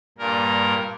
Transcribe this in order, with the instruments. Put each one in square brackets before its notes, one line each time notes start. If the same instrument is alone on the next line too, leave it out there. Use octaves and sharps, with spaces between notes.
[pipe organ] G2 A#2 A#4